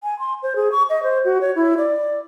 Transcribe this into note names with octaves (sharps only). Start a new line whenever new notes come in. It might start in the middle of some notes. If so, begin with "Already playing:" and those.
G#5
C6
C5
G#4
C#6
D#5
C5
F#4
C#5
E4
D5